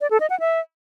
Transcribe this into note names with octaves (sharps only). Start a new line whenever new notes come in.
D5
A4
D#5
F#5
E5